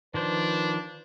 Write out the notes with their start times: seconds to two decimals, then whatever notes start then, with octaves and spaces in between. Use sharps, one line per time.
0.14 D#3 F3 D4 B4 C5